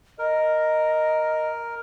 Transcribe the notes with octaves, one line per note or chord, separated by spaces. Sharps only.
A#4 D#5